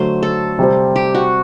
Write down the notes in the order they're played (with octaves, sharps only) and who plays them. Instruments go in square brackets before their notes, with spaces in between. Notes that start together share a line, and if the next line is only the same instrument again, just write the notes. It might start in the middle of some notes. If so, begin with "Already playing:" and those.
Already playing: [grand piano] D3 F#3 A3 [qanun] C5
[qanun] A4
[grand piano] C3 G3 C4
[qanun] G4
F#4